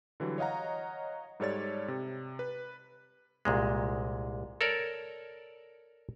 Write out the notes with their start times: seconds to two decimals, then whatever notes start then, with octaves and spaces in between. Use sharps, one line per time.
0.20 D3 E3 F#3 G3
0.38 C#5 D#5 F5 F#5 A#5
1.40 G#2 G3 A4 C#5 D5 A6
1.88 C3
2.39 B4
3.45 C2 A#2 G#3
4.61 A4 A#4 C#5 D5